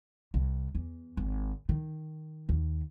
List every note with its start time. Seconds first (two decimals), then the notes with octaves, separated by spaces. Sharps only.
0.34 C2
0.75 E2
1.17 G#1
1.69 D#3
2.49 D#2